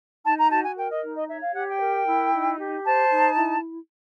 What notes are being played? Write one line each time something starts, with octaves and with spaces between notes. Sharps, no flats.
D#4 A5
A#5
F#4 A5
G#5
A#4 G5
D#5
D#4
D#5
C#5 E5
F5
G4 F#5
G5
A#4
E4
D#4
G4
C5 A5
D#4
E4